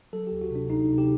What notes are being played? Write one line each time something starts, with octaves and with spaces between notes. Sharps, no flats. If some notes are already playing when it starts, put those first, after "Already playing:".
F#3 A4
D2 G4
F#4
C3 D4
D2 D#4
C3
G4